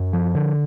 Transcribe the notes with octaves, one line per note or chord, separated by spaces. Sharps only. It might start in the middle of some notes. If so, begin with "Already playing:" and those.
Already playing: F#2
F3
D3